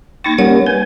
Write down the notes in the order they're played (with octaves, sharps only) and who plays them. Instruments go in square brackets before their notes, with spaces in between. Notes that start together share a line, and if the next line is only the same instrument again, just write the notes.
[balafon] A#3 D#4 G5 [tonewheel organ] C#6 A6 A#6
[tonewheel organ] G3 A#3 C#4 [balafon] F#5
[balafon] B4 [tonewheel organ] G#5